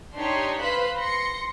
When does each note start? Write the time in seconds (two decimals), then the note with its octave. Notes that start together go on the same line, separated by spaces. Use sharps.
0.15 D4 D#4 G4 C#5 C6
0.59 B4 C5 F5 B5 F#6
0.98 C6 A#6 C#7